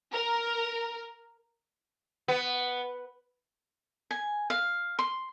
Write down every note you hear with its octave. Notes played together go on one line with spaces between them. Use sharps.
A#4
B3
G#5
F5
C6